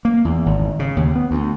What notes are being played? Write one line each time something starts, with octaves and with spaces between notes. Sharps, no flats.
A#3
E2
G#1
C#3
D#2
B3
D2